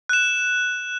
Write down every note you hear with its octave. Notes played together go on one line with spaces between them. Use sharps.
F#6 E7